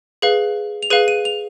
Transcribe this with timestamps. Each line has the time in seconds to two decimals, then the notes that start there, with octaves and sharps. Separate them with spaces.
0.22 G#4 B4 F5
0.83 F7
0.90 G#4 B4 F5 D#7
1.08 D#7
1.25 F7